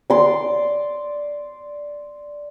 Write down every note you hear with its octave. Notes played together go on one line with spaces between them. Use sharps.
D5 C6